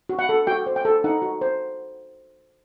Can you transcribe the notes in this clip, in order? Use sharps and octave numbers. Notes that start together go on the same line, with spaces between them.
F#4
F#5
A4
F#4 G5
C5
G5
A4
D#4 F#5
F#4
C5